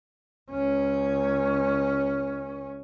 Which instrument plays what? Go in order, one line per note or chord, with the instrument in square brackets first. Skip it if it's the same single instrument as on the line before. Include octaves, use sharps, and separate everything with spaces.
[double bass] C#2 C#4